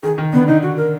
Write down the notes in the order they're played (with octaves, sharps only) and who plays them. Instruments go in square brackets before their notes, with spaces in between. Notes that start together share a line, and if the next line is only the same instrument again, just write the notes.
[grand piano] D#3 [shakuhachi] G#4
[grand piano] D#3
[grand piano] D3 [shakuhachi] B3
[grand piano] D3 [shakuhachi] D#4
[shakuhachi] F#4
A#4